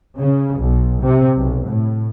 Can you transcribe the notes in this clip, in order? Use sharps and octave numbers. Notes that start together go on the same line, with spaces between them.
C#3
B1
C3
B1
A2